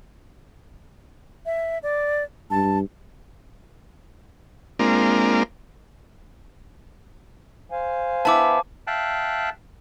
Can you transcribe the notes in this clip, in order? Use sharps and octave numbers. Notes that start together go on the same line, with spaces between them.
E5
D5
G2 A5
G#3 A#3 C4 D4 F4 A#4
C5 F5 G#5
B3 E4 A5 D6
E5 F5 G5 A5 F#6